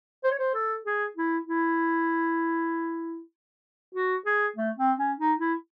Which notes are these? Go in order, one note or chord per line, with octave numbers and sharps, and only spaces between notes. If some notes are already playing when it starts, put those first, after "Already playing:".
C5
C#5
C5
A4
G#4
E4
E4
F#4
G#4
A3
C4
C#4
D#4
E4